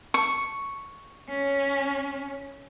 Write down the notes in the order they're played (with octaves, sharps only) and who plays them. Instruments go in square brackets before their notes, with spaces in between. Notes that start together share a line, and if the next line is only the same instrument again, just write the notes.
[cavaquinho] C#6
[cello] C#4